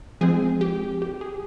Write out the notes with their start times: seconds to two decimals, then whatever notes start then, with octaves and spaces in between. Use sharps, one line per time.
0.21 F3 G#3 C4 G#4
0.61 G4
1.02 G4
1.21 G#4